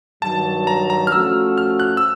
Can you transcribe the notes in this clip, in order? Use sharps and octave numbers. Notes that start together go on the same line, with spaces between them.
G2 D#3 F#3 A5
A#5
A#5
F6
F3 A3 C#4 F#4 E6
F6
F#6
E6